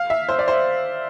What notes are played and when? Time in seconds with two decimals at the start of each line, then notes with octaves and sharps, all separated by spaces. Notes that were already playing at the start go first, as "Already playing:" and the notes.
Already playing: F5
0.10 E5
0.29 C5
0.39 D5
0.48 C5